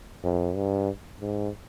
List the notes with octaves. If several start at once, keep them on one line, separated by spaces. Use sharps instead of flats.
F2
G2
G#2